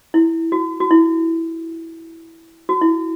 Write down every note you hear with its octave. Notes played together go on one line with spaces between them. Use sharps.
E4
F#4
F#4
E4
F#4
E4